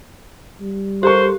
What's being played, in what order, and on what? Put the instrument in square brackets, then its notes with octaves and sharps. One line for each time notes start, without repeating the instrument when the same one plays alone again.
[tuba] G3
[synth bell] G4 [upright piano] A4 A#4 C#6 [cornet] C5